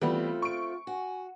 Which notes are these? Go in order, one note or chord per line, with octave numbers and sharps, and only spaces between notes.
E3 G3 A3 B3 C4 F4
C#6 D7
F#4 G#5